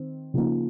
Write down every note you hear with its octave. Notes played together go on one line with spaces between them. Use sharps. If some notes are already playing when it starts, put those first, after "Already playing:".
Already playing: D#3 C4
C#3 F3 A#3 D#4